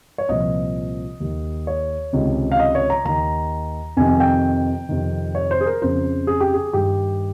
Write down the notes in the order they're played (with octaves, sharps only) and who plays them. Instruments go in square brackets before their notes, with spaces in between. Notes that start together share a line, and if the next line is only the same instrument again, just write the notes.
[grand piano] C#5
C2 A#2 F3 D#5
D#2 D#3
C#5
C#2 C3 D#3
F5
D#5
C#5
A#5
D#2 D#3 A#5
F2 C3 D#3 G#5
G5
F2 C3 D#3
C#5
C5
G#4
A#4
F2 C#3 F3 C5
G#4
G4
G#4
G2 D#3 G4